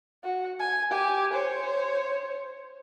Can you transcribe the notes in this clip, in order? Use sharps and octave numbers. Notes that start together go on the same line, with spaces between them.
F#4
G#5
G4 G#5
C5 C#5